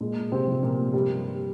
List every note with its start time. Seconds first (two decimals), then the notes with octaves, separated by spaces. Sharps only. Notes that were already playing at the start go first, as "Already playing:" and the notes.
0.01 A#2 G#3
0.32 C3 C4
0.47 F3
0.63 A#2 A#3
0.94 G2 G3